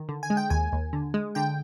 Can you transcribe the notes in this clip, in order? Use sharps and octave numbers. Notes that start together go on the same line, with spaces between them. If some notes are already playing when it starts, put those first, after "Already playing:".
Already playing: D#3
D3
G#5
G#3
G5
D#2 G#5
D#2
D3
G#3
D3 G5